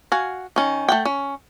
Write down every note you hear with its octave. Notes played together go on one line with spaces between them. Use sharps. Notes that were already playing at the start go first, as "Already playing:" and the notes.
F#4 F5 G#5
D#3 C#4
A3 F#5 G5
C#4